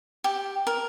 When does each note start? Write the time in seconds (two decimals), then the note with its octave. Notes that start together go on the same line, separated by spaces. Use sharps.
0.24 G4
0.67 A#4